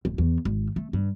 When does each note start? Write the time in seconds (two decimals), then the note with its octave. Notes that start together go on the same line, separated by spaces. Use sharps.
0.05 D1
0.18 E2
0.45 G#1
0.76 A3
0.93 G2